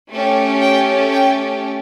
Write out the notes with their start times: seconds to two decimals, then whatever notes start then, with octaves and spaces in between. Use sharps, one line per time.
0.12 A3 C#4 G4
0.61 G5
1.10 G5